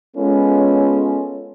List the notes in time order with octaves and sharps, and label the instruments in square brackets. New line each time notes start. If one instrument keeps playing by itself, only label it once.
[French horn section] G#3 B3 C#4 F4 A4